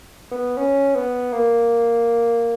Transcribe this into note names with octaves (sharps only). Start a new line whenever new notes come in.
B3
C#4
B3
A#3